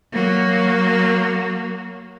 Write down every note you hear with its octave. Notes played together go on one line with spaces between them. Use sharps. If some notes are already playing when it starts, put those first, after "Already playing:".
F#3 A#3